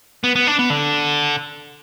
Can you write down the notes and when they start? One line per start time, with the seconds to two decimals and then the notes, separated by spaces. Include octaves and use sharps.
0.24 B3
0.36 B3
0.47 D4
0.59 B3
0.70 D3